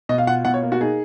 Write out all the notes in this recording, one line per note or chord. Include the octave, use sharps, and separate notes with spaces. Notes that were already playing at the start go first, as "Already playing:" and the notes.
B2 D#5
F5
F4 F#5
B2 F#5
C#5
A#3
F#4
D#4 G#4